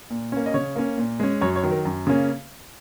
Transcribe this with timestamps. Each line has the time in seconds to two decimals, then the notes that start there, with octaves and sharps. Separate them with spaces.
0.10 A#2
0.32 A#3 C#4
0.46 D#5
0.54 C#3 C#5
0.76 A#3 C#4
0.98 A#2
1.20 G#3 C#4
1.41 F#2 C#5
1.56 C#5
1.63 D#3 F#3
1.71 A#4
1.85 F#2
2.07 C#3 A#3 C#4